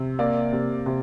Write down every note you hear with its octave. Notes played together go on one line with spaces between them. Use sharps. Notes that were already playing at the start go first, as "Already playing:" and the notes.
Already playing: C3
A#3 D5
C3
C3